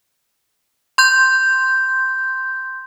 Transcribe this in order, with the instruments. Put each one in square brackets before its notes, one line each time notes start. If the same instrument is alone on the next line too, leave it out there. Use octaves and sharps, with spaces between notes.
[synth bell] C6 G6